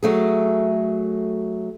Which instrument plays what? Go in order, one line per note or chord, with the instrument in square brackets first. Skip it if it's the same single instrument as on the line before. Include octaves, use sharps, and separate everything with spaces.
[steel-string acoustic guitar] F#3 A3 G#4